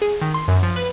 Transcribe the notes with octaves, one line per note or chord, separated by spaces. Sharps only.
G#4
D#3
C6
F#2
F3
B4